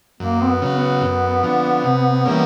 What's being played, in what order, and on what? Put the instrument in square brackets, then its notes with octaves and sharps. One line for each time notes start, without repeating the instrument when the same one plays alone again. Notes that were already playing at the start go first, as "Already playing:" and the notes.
[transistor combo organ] F#2 [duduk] A#3
[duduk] C4
B3
[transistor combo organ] C#3 F#3
[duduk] B3
[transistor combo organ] F#2
D3 F3
C3
E3 G3 A#3 C#4